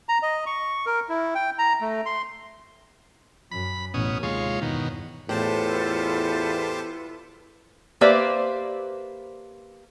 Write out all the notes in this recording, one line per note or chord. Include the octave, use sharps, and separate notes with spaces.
A#5
D#5
C#6
A#4
E4
G5
A#5
A3
C6
F#2 B5
A1 E2 B2 C#4 D#6
D#2 C3 G#3 F4 C#5
E2 G2 B2 D#3
E2 A2 F4 G4 A4 B4 C5 A5
A#3 G4 B4 C5 D5 E5